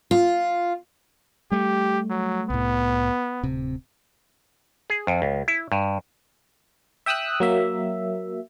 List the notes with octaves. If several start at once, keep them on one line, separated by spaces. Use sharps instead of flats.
F4
G3 A3 G4
F#3
C2 A2 B3
D1 C3
G#4
F2
C#2
E4
G2
E5 G5 D#6 E6 F#6
F#3 A#3 E5